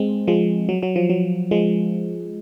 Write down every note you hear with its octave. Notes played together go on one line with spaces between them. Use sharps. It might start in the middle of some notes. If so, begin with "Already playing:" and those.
Already playing: G#3 C4
F3 G#3
F#3
F#3
F3
F#3
F3 G#3